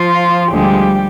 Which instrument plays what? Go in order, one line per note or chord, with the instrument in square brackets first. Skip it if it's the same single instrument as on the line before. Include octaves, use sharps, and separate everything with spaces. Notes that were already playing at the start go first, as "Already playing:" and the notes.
Already playing: [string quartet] F3 F4
D2 D3 F3 G3 G#3 G4